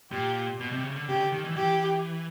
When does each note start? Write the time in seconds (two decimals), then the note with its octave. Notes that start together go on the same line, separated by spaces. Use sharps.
0.11 A#2 G4
0.60 B2
0.72 C3
0.84 C#3
0.96 D3
1.08 C#3 G4
1.20 D3
1.32 D#3
1.45 E3
1.56 E3 G4